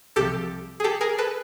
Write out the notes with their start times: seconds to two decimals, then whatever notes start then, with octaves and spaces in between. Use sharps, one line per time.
0.16 C2 C3 F3 G4 A4
0.80 G#4
0.84 G4 A4
1.01 G#4 A#4
1.18 A4 B4